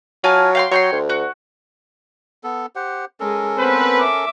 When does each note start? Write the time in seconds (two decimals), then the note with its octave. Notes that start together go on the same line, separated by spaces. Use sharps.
0.24 F#3 F4 G#5 A5
0.55 F5 G5 C6
0.72 F#3 C#5 G5 C6
0.92 D2
1.10 F#4
2.44 B3 A4
2.76 G4 C5 F#5
3.20 G#3 C#4 A4 A#4
3.58 B3 C4 B4 C5
3.99 E5 D6